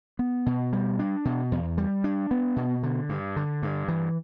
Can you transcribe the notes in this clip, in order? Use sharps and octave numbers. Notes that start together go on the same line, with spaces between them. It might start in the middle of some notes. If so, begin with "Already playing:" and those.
B3
B2
G3
D4
B2
E2
G3
D4
B3
B2
D3
G2
D3
G2
E3